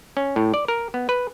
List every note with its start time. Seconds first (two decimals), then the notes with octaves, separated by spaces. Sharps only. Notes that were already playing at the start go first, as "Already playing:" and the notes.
0.17 C#4
0.36 A2
0.54 D5
0.68 A#4
0.94 B3
1.09 B4